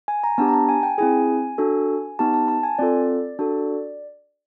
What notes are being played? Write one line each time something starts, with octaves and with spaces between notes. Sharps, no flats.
G#5
A#5
B3 D4 G4 A5
A#5
A5
G#5
G5
C4 E4 G#4 G#5
D4 F#4 A4
B3 D#4 G4 A5
A5
A5
G#5
C4 F4 A4 D5
D4 F#4 A4